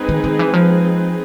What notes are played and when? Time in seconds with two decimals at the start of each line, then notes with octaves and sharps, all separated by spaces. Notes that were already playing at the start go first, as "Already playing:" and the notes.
Already playing: G#3 C4 D#4 G#4 B4
0.09 D#3
0.24 D#3
0.39 E3
0.54 F3